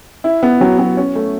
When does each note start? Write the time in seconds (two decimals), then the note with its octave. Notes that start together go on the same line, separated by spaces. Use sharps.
0.24 E4
0.43 B3
0.61 F#3
0.79 F#3
0.97 C#4
1.15 A3